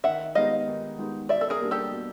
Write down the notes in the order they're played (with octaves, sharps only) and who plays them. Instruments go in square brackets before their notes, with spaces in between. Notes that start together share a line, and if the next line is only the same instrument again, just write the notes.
[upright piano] D#3 [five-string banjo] E5 F#5
[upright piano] G#3 B3 D#4 G4 [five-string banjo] D#5 F5
[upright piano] D#3
G#3 B3 D#4 G4
[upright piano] B2 [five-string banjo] D5 E5
[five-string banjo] A4
G#4 A#4
[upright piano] G3 A#3 D4
[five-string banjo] G4 A4
[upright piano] B2